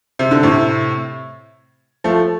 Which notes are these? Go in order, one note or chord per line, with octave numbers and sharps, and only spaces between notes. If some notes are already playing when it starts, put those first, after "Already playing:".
C3
D3
A2 C3
F3 A3